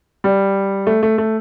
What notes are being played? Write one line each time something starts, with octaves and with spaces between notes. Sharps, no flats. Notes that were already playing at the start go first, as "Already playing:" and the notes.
G3
A3
A3
A3